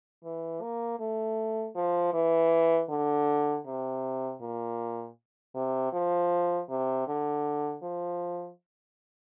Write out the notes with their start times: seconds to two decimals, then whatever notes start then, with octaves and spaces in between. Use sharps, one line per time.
0.24 E3
0.62 A#3
1.00 A3
1.75 F3
2.13 E3
2.90 D3
3.66 C3
4.41 A#2
5.55 C3
5.93 F3
6.70 C3
7.08 D3
7.83 F3